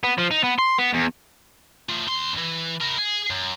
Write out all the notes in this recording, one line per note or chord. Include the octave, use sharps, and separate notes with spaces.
B3
F3
D#4
B3
C6
B3
E2
A3 F4
D#2 C6
E3
E4 A#4
G#4
F#2